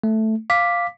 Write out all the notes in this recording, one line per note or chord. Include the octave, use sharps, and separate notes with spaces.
A3
F5 D6 B6